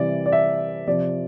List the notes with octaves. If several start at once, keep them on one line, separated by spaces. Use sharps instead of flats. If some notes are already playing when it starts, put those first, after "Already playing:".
Already playing: C3 E3 G3 D5
D5
E5
C3 F3 D5